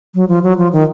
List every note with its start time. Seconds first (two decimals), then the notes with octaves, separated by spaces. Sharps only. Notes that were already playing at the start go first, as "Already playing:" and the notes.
0.15 F#3
0.29 F3
0.43 F#3
0.58 F3
0.73 D#3